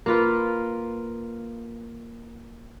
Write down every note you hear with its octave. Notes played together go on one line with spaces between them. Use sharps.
A#3 F4 B4